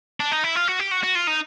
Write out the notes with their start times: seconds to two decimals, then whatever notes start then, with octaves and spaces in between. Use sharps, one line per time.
0.20 D4
0.31 D#4
0.44 E4
0.55 F4
0.68 F#4
0.79 G4
0.91 F#4
1.03 F#4
1.15 F4
1.27 D#4